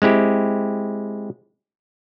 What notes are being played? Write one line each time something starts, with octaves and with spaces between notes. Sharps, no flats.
G#3 C4 E4 G4